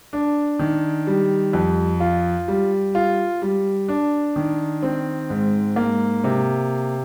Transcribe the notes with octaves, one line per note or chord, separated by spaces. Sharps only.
D4
D#3
G3
F2
F4
G3
F4
G3
D4
D#3
C4
G#2
A#3
C3